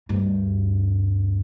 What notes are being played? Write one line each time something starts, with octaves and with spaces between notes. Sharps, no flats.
D2 G2